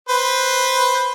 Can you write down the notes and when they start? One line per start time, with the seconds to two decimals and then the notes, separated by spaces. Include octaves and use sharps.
0.09 B4 C5